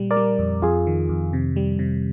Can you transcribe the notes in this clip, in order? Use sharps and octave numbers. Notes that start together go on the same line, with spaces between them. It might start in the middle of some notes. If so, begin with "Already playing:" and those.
Already playing: A#2 G3
A#4 D5
G3
F2
F2 F4 G#4
D#3
F2
C3
G3
C3